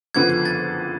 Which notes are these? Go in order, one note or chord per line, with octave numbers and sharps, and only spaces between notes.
F#1 F2 D3 F3 B3 G#6
G#6
A6